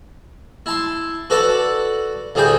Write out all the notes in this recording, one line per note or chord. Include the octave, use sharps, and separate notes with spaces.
E4 A5 C6
F#4 A4 B4 D5 F#5 A5
D2 A2 G3 F#4 G#4 G5